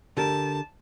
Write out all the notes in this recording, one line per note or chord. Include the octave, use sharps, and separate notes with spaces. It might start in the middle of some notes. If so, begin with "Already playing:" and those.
D3 G4 A#4 A5